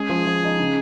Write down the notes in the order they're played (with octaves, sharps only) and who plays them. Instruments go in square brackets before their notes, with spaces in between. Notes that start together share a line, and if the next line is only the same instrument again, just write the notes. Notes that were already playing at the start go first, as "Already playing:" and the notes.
Already playing: [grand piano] G#3 C#4 [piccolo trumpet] G#4
[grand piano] F3
F3
D#4
C#3